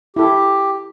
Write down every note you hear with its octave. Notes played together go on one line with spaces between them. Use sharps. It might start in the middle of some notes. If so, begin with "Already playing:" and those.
E4 G4 A4